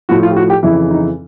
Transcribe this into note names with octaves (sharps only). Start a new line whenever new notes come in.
A2 F3 F#4
F4
G4
F#4
G4
F2 C#3 E3 E4
D#4